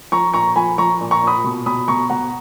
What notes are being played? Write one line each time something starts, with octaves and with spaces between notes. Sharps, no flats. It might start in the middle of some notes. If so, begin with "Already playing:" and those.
F3 A#5 C#6
A#2 A#5 C#6
F3 G#5 B5
F3 A#5 C#6
A#2
A#5 C#6
A#2
B5 D#6
B2
B2 B5 D#6
B2 A#5 C#6
B2 F#5 A#5